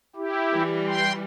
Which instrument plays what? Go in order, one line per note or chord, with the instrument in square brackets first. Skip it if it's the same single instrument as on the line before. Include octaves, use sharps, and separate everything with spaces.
[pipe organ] E4 G4
[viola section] E3 G3
[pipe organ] G5 C6